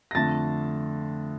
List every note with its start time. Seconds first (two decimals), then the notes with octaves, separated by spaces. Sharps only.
0.11 A#6
0.15 F2 D3 A3 A5 A6